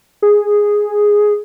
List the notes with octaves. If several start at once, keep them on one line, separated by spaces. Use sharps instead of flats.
G#4